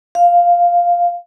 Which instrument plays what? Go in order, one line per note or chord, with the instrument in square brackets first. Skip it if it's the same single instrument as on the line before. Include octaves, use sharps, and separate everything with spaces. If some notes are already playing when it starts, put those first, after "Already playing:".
[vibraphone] F5